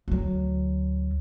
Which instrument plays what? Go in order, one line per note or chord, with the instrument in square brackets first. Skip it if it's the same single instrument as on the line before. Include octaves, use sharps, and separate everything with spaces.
[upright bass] D2 F#3